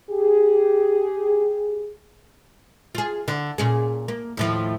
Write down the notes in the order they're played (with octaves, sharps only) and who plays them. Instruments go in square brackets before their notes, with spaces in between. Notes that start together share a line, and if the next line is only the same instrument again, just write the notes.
[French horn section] G4 G#4
[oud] F4 G#4
D3
A#2 C#4 G#4
A#3
D#2 A2 F3